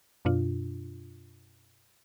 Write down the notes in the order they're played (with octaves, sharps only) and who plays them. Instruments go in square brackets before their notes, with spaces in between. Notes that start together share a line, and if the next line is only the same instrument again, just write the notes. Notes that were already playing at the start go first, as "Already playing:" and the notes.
[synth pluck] F#2 B2 D4 F4